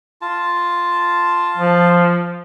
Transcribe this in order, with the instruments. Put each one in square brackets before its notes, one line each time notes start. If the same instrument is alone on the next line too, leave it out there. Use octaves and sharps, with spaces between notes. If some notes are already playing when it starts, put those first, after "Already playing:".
[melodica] F4 A5
[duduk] F3